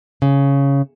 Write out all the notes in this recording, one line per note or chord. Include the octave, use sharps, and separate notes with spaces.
C#3